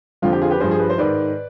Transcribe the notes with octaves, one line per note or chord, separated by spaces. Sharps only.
F2 D3 F3 F4
G4
F4 G#4
G4 B4
G2 F3 G#4 C5
G#4
B4
C5
G#2 D#3 B4 D5